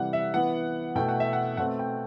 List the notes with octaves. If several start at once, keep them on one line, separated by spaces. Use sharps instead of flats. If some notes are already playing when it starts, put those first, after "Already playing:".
Already playing: C3 E3 G3 F#5
E5
E3 B3 E4 F#5
B2 A3 E4 G5
F#5
E5
F#5
B2 A3 C4 F#5
G5